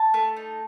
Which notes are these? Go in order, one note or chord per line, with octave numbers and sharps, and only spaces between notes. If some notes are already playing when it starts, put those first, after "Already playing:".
Already playing: A5
A3
D#4